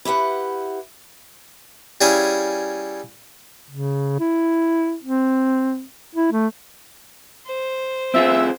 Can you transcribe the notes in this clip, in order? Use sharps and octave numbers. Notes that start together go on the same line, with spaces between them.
E4 G4 B4 F#5
G3 C#4 E4 G#4 F5
C#3
E4
C4
E4
A3
C5
C4 F4 G#4 E5